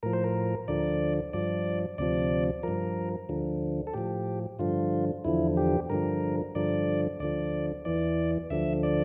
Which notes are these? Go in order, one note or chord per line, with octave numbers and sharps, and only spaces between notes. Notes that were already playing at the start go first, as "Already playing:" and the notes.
A2 F3 A#4
C5
A#4
D2 D3 F3 D5
G2 F3 D5
D2 C3 F3 D5
G2 F3 A#4
D2 D3 F3
A4
A2 F3 G4
G2 D3 F3 F4
E2 D3 F3 E4
G4
G2 D3 F3 A#4
G2 D3 F3 D5
D2 D3 F3 D5
E2 E3 D5
D2 D3 F3 E5
D5